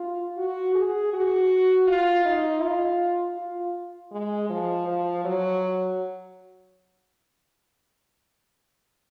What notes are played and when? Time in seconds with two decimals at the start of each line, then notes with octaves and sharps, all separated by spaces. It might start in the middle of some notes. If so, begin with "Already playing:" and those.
Already playing: F4
0.37 F#4
0.75 G#4
1.13 F#4
1.87 F4
2.25 D#4
2.62 F4
3.38 F4
4.12 G#3
4.49 F3
4.87 F3
5.24 F#3